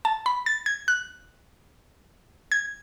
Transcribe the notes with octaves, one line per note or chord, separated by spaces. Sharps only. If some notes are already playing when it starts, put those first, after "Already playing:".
A5
B5
A6
G#6
F#6
G#6